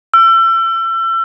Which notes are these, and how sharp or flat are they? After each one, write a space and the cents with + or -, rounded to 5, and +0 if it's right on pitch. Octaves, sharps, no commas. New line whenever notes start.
E6 +35